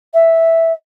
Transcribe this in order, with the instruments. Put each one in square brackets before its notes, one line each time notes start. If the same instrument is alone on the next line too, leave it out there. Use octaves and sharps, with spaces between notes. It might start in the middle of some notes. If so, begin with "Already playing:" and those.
[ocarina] E5